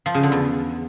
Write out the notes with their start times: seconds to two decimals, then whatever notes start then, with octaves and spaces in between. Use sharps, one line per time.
0.06 F3
0.14 C#3
0.23 D3
0.32 E2